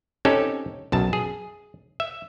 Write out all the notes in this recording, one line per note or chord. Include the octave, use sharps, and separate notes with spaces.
C4 C#4 D#4 G4 A4
B1 F#2 A5
G#4
E5